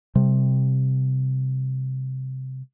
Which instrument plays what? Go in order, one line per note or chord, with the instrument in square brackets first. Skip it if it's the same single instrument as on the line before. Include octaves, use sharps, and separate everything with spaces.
[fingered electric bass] C3 G3